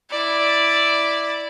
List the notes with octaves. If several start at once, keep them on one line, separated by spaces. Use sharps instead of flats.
E4 D5